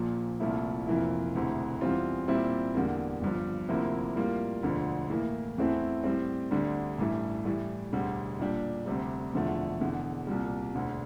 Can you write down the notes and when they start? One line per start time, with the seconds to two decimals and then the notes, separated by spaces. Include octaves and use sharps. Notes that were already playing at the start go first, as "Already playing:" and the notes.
Already playing: A#1 A#2 F3
0.40 C2 A#2 F3 A3 E4
0.87 F1 F2 E3 A#3 E4
1.34 E1 D2 C3 E3
1.81 E2 E3 G3 C4 F4
2.28 A#2 G3 C4 E4 G4
2.75 E2 D3 G3 A#3
3.22 G1 G2 F3
3.69 D2 C3 F3 A#3 E4
4.16 A2 G3 A#3 F4
4.63 E1 D2 D3 F3
5.10 A2 E3 A#3
5.58 E2 E3 A3 C4 E4
6.04 A2 G3 C4
6.51 D2 D3 G3 D4
6.98 A1 G2 E3 A3
7.45 A2 E3 G3
7.93 E1 D2 D3 G3
8.40 A#2 G3 D4 G4
8.86 D2 C3 G3
9.34 E1 E2 D3 F3 A3
9.80 E1 E2 D3
10.27 C2 A#2 G3
10.74 E1 D2 D3